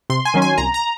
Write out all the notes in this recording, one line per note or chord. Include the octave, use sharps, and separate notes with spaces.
C3 C6
G#5
D#3 F#3 C#4
G#5
C2 A#5
A#5